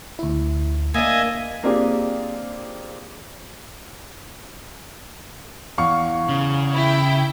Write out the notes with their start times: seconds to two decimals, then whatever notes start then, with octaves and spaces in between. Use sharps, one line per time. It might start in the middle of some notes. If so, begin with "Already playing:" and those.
0.19 D2 E4
0.94 A#3 D4 D#5 E5 G#5
1.63 A#3 C4 D4 F4 G4 G#4
5.78 E2 F5 C#6
6.28 C#3
6.74 E4 G5